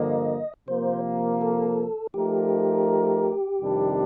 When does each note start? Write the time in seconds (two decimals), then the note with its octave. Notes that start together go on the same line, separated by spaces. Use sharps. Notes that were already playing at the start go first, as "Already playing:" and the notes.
Already playing: G2 D3 F3 A#3 D#5
0.68 C3 F3 A#3 C5
1.41 A4
2.14 F3 A3 D#4 G4 A#4
3.60 F2 C3 D#3 G3 D4